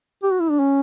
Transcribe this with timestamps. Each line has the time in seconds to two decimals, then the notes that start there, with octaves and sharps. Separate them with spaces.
0.23 G4
0.32 F#4
0.41 E4
0.50 D4
0.59 C#4